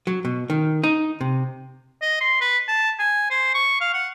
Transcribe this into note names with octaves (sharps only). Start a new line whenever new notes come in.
F#3
B2
D#3
D#4
C3
D#5
C6
B4
A5
G#5
C5
C#6
F5
F#5